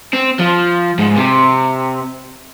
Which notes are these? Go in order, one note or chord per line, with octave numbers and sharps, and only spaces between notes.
C4
F3
G#2
C3